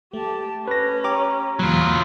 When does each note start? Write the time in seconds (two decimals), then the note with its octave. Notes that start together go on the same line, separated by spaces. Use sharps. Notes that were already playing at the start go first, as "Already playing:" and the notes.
0.13 A3 G4 A5
0.68 C#4 B4 A#6
1.04 G4 C#5 A#5 D6
1.59 E2 A#2 F#3 F4 B5